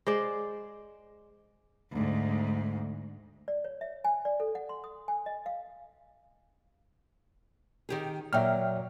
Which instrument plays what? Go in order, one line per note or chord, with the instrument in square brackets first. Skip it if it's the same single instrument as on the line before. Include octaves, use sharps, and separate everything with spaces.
[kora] G#3 C5 D5
[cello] D2 G#2
[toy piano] D5
C#5
E5
G#5
D5
A4
F#5
C6
D#6
G#5
D#5
F5
[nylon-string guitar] D#3 G4 G#4
[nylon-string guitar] A#2 F#3 [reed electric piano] E5 G5 F6